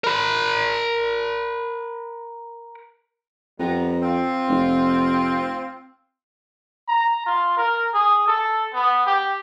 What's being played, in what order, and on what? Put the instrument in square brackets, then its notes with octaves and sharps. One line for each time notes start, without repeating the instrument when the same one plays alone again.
[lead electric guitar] A#4 B5
[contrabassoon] F2 [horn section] G3 B3 A#5
[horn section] C4 F4
[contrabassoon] F1
[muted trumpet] A#5
F4
A#4
G#4
A4
B3
G4